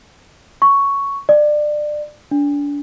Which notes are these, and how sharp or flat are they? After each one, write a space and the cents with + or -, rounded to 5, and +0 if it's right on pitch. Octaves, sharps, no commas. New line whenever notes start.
C#6 +5
D5 +25
D4 -30